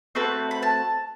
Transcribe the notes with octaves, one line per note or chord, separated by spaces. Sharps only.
A3 C4 F#4 B4
B5
A5